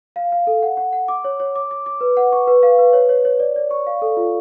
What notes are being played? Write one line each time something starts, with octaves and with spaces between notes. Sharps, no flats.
F5
F5
A4
F#5
F#5
F#5
D6
C#5
C#5
D6
D6
D6
B4
F#5
C#6
B4
F5
B4
C#5
C#5
C#5
D5
D5
C#6
F5
A4
F4